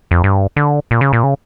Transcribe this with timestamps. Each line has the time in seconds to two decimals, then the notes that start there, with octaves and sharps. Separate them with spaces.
0.11 F2
0.24 G2
0.56 D3
0.91 A#2
1.01 C#3
1.13 A#2
1.23 C#3